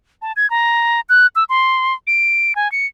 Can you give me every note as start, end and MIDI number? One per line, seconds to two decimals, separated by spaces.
0.22 0.32 81
0.36 0.49 92
0.50 1.00 82
1.09 1.27 90
1.36 1.44 88
1.49 1.94 84
2.07 2.55 98
2.56 2.71 80
2.72 2.86 97